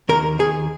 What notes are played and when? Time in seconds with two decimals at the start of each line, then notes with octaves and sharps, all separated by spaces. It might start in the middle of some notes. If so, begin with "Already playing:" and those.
0.09 D#2 A#4
0.39 D#2 G#4